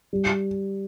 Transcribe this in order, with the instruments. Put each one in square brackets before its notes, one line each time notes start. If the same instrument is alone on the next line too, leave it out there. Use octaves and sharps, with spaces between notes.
[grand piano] G3